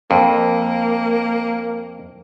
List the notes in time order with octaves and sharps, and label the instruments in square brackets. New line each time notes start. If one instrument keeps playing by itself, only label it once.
[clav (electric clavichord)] F2 [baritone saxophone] A#3